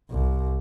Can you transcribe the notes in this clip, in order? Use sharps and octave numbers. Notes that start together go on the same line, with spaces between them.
C2